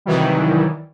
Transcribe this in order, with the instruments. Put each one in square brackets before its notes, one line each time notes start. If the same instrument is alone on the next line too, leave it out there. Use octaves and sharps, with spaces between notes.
[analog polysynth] C2 D#3 E3 F#3 G3